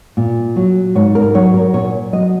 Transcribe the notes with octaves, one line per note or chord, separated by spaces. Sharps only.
A#2
F#3
G#2 C#5
A#4
F#3 C#5
A#4
A#2 C#5
F#3 D#5